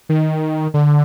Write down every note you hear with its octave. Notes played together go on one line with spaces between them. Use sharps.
D#3
D3